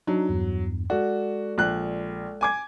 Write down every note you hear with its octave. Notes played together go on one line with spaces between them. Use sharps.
F#3 D4 D#4
E2 G2
G#3 F#4 A4 D5
A#1 F#6
G#5 D6 G#6